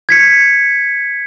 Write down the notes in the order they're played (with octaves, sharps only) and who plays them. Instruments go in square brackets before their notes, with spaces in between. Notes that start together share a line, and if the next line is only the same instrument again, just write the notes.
[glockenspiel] G#6 B6 C#7